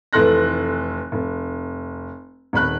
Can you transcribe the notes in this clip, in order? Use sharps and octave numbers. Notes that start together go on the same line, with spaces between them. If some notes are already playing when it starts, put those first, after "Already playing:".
F1 E3 A4 C6 F#6 A#6
F1
D#1 D#3 B5 F#6